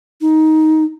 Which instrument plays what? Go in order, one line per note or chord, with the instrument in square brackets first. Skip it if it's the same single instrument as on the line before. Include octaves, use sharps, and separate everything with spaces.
[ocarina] D#4